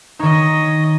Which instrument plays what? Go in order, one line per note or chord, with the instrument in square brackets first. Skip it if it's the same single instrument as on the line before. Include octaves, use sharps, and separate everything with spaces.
[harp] D#3 D#4 [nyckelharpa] C#5 D#5